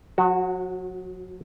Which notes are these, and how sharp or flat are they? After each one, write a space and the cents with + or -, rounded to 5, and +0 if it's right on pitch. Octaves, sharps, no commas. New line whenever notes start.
F#3 -40 F#4 +0